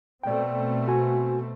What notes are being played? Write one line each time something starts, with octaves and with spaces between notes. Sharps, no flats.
B2 A3 C4 D5 G5
F#4 G#5